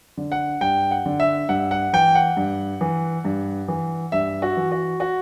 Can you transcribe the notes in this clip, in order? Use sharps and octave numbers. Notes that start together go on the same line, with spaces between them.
D3
F#5
G2 G5
F#5
D3
E5
G2 F#5
F#5
E3 G5
F#5
G2
E3
G2
E3
G2 E5
F#4
E3
F#4
F#4